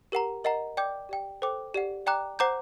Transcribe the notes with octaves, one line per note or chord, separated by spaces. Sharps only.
G4 A#4 F#5 A#5
A#4 D#5 F#5 A#5
D5 G5 D6 G6
G4 D5 G5
A4 C5 G5 D6
G4 D5 F#5
D5 G5 A#5 D6 F#6
C5 F#5 A#5 D6 G6